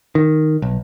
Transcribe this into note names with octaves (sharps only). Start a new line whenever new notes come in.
D#3
B1